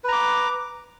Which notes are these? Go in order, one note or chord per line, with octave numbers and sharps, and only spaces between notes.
B4 A#5 D6